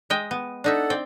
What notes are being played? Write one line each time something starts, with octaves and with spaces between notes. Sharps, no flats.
G#3 D#5 G5
B3
D4 D#4 A4 E5 F#5
C4 D5 G5